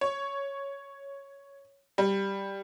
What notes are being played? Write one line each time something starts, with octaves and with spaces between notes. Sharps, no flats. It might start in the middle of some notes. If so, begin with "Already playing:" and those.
C#5
G3